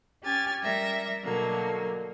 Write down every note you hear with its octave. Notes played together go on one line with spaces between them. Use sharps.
C#4 G4 G#5 F6 A6
G3 A#4 E5 A#6
B2 D3 F#3 A#3